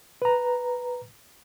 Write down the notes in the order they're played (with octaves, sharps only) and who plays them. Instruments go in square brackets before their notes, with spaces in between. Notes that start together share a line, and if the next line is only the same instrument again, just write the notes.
[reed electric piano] B4 A#5